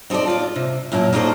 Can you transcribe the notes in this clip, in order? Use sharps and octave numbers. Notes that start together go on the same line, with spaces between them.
C4 D#4 F4 A4 D5
F4 D5
C3
F#2 A#2 E4 A5
G3 A#3 D#4 F#4 A4 C5